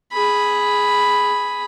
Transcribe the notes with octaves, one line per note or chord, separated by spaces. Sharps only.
G#4 B5